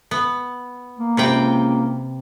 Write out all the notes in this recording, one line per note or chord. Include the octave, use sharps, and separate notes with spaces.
B3
A#3
C#2 C3 B4 G5